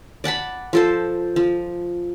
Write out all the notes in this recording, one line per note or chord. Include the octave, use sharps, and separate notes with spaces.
D5 F#5 A5 B5
F3 A4 C5
F3